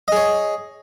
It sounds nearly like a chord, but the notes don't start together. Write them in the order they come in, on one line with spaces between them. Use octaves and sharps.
D#5 G#4 C#5